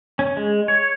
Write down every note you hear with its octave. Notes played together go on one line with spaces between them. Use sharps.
C#4
G#3
C#5